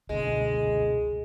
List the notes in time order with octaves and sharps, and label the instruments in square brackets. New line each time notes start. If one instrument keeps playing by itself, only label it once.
[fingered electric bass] C#2 B2 D3 [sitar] G#3